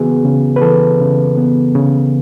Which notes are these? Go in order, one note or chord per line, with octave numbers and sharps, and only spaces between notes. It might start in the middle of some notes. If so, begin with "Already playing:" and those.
Already playing: C#3 E3 B3 F#4 G#4
C#3
B4
E3 A4
C#3
B3
C#3